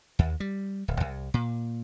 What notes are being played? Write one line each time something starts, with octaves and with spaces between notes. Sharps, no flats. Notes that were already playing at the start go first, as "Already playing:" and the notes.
D#2
G3
D1
C2
A#2